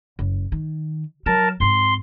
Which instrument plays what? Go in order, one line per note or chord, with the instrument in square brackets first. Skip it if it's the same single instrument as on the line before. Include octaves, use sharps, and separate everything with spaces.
[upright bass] F#1
D#3
[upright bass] F#3 [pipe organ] A#4 A5
[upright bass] G#2 C4 [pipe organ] C6